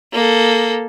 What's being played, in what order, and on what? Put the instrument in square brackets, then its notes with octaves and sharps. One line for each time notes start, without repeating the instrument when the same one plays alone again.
[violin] A#3 A4